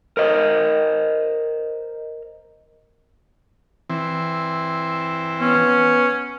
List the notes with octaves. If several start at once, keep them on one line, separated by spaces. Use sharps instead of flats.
A#4 C5 D#5
E3 C4
B3 C#4